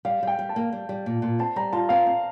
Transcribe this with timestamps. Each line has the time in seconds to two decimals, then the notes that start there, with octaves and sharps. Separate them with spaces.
0.05 G3 F5
0.23 G3 G5
0.39 G3
0.49 A5
0.56 A#3
0.72 G3
0.89 G3
1.06 A#2
1.22 A#2
1.39 C4 A5
1.56 G3 A#5
1.73 F4 A5
1.89 C4 F5
2.07 C4